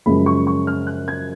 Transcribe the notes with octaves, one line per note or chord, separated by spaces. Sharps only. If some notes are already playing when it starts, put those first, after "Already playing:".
F#2 C#3 F3 G#3 B5
C#6
C#6
F6
F#6
G#6